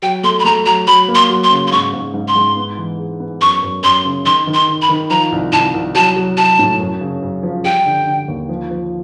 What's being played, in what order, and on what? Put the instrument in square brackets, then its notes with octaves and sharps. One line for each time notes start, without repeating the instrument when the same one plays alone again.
[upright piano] F#3 [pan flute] G5
[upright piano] A3 [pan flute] C6
[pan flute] B5
[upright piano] A3 [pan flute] A#5
[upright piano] F#3 [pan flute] A#5
[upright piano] F#3 [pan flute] B5
[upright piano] A#3
[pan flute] C6
[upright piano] F#3
[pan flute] C6
[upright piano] C#3
[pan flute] C6
[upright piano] G#2 [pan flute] C#6
[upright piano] G#2
G#2
[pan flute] C6
[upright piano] G#2
B3
E3
G#3
B3
[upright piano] F#2 [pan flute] C#6
[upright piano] F#2
[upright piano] F#2 [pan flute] C6
[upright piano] C#3
[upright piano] D#3 [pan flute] C6
[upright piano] D#3
[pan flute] C6
[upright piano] D#3
[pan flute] B5
[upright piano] D#3
[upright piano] F3 [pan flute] A#5
[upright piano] C2
[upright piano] C2 [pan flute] A5
[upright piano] C2
[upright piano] F#3 [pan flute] A5
[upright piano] F#3
[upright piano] F#3 [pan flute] A5
[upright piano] A2
F#2
C#3
F#2
F3
[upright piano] G3 [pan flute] G5
[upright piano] D3
D3
D#2
F3
F3